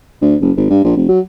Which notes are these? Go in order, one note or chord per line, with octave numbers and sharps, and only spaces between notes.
D2
F#1
G#1
G2
A#1
F1
F#3